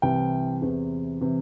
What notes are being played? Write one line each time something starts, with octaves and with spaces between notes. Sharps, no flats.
C2 C3 E3 G5
E2 C3 E3
C3 E3